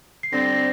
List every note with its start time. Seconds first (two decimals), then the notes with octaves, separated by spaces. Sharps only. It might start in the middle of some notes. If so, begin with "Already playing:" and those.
0.23 C7
0.33 D3 G3 C4 A#6